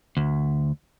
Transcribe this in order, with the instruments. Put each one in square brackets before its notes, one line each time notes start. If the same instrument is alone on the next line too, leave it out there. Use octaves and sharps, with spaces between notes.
[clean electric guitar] D2